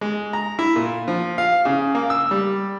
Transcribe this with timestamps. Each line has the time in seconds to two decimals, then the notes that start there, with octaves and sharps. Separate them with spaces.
0.01 G#3
0.33 A#5
0.59 E4
0.76 A#2
1.08 F3
1.38 F5
1.65 C#3
1.95 A#3
2.10 E6
2.31 G3